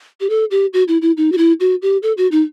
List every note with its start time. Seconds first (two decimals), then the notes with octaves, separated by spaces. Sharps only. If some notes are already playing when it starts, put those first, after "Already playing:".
0.20 G4
0.30 A4
0.51 G4
0.73 F#4
0.88 E4
1.02 E4
1.17 D#4
1.32 F#4
1.38 E4
1.60 F#4
1.82 G4
2.03 A4
2.17 F#4
2.32 D#4